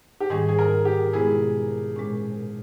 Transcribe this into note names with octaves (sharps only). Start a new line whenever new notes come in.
G4
G#2 D#3 G3 C#4 G#4
G#4
A#4
G4
B2 G#3 B3 E4 G#4
A#2 G#3 C#4